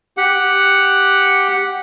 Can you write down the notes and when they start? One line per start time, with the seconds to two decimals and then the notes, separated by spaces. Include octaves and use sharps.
0.17 G4 F#5